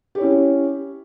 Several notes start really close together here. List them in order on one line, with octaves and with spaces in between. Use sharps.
G4 C#5 E4 C#4